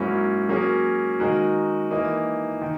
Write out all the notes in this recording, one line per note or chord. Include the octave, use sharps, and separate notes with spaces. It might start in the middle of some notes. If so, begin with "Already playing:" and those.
Already playing: G#2 F#3 A#3 C#4 E4
F#3 A#3 C#4 G#4
D#3 G#3 D#4 F#4 A#4
E3 A#3 D#4
D#3